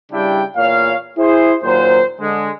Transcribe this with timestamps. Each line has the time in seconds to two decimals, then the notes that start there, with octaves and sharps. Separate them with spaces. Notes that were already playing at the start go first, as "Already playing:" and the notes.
0.12 C#3 G3 D4 E4 G5
0.57 E2 A#2 C#5 F5
1.18 E4 G#4 C5
1.63 D#2 A#2 F#3 C5
2.21 D3 G#3